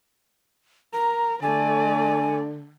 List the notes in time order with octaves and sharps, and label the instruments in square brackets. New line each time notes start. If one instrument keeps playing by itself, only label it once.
[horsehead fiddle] A#4 [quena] A#5
[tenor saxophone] D3 [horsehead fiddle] A3 D5 [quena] G#5